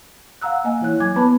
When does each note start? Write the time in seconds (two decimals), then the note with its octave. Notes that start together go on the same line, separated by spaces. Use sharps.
0.41 F5 F#5 A#5 E6 F#6
0.64 A#3 D#5 G#5
0.81 E3 E4 C#5 F#6
1.00 F#3 G#5 D6 G#6
1.16 B3 B4 A5 B5 D6